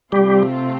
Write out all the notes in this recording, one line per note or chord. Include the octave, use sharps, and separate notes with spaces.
C3 G3 A3 C4 F4 G4